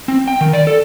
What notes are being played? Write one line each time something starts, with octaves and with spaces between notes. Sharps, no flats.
C4
G5
D#3
D5
A4